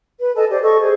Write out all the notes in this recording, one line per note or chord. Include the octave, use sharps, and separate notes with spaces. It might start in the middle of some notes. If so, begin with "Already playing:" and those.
B4
A4 D#5 G#5 A5
G4 C5 D5
A4 D#5 C#6
G#4 C5